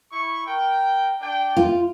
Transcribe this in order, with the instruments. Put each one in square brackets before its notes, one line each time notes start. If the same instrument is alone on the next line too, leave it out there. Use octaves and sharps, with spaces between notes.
[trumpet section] E4 C#6
A#4 G5
D4 G5
[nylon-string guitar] F4